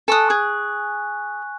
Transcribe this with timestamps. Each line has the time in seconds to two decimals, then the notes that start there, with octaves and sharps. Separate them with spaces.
0.08 A4 G#5 C#6 D#6 F#6
0.30 G#4